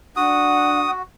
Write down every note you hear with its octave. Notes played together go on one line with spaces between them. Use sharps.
D4 F#4 F#5 D#6